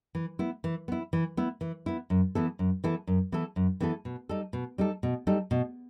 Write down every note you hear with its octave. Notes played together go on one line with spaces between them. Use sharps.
E3
B3 E4
E3
B3 E4
E3
B3 E4
E3
B3 E4
F#2
E3 B3 E4 A4
F#2
E3 B3 E4 A4
F#2
E3 B3 E4 A4
F#2
E3 B3 E4 A4
B2
G3 D#4 A4
B2
G3 D#4 A4
B2
G3 D#4 A4
B2